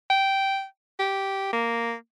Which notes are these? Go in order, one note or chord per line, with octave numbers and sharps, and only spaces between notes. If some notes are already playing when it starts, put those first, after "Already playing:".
G5
G4
A#3